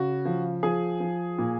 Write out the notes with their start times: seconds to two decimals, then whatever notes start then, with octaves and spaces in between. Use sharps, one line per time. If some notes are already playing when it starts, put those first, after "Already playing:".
Already playing: C#3 F#4
0.25 F3
0.63 F3 G#4
1.00 F3
1.38 A#2